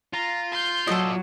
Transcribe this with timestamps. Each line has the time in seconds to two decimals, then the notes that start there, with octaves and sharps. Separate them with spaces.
0.13 F4 A#5
0.52 C6 G6
0.87 F#3 F4 A4 D5 D#5